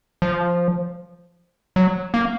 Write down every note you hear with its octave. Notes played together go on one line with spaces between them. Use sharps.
F3
F#3
A#3